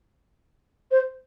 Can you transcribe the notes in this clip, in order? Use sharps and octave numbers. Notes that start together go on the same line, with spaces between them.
C5